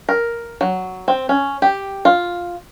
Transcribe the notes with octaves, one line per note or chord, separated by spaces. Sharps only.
A#4
F#3
C4
C#4
G4
F4